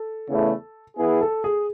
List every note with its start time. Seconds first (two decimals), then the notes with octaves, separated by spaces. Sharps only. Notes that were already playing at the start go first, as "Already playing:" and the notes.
Already playing: A4
0.28 E2 C#3 E3 A3 E4
0.97 E3 B3 E4 G#4
1.21 A4
1.44 G#4